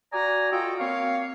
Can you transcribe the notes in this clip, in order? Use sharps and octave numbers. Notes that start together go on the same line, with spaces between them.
F#4 D5 G#5 A#5
F4 F#4 A4 D#5 G5
A#3 C4 C#5 F5